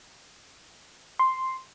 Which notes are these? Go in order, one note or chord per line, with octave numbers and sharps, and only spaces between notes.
C6